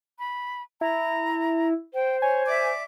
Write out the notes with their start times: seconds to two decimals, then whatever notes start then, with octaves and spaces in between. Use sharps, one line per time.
0.19 B5
0.81 E4 A#5
1.94 C5 G5
2.22 C#5 G#5
2.47 D5 E5 D6